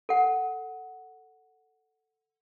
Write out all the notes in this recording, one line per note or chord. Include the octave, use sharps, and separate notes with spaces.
A4 F#5